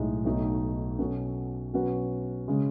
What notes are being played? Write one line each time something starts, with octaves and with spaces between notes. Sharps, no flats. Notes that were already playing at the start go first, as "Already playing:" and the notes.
Already playing: B1 A2 G#3 D#4
B1 B2 A3 D#4
B2 F#3 C#4 F#4 A4
B2 F#3 C#4 F#4 B4
C#3 G#3